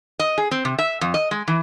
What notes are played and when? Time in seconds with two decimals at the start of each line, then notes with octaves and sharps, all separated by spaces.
0.19 D#5
0.38 G#4
0.51 C4
0.65 C3
0.79 E5
1.01 F2
1.14 D#5
1.31 G#3
1.48 E3